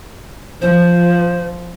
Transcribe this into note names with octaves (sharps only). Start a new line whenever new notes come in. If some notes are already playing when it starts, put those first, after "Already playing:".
F3 C5